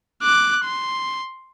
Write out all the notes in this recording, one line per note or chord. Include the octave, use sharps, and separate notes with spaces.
D6 F#6
C6